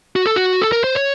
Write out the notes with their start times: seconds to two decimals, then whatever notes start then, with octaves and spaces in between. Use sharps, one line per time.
0.16 F#4
0.26 A4
0.36 F#4
0.62 A4
0.72 A#4
0.84 C5
0.95 C#5